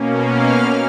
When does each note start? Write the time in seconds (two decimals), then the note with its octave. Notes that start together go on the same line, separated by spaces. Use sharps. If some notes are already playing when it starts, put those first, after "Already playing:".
Already playing: B2 A#3 C#4
0.32 F5 F6